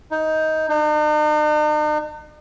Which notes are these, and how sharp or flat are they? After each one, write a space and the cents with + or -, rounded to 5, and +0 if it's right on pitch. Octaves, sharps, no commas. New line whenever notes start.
D#4 +15
D#4 -45